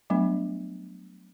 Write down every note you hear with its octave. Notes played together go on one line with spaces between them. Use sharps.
F#3 G3 A3 B3 D4